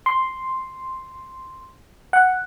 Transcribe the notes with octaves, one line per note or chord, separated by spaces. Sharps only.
C6
F#5